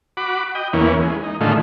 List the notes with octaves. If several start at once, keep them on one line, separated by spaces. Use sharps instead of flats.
F#4 B5 D6
D#5 G5
E2 E3 A#3 C#4
G#3
D#4
A2 D3 D#3 G#3 A3 F4